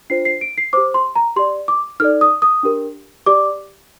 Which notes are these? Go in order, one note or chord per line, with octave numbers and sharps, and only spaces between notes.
D4 F4 C5 C7
C7
D7
C7
G4 C5 D6
C6
A#5
G4 D5 C6
D6
D#4 A4 D5 F6
D#6
D#6
D4 G4 A#4
G4 D5 D6